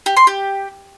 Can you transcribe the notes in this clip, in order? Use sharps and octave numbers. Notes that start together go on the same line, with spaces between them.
G4
C6
G4